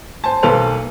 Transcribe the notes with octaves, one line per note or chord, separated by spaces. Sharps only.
C5 G#5 A5
B1 A#3 A4 B4 C5 F7